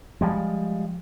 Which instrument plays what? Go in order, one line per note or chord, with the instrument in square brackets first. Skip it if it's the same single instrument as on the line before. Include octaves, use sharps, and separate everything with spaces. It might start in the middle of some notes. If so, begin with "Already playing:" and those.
[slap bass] F3 G3 G#3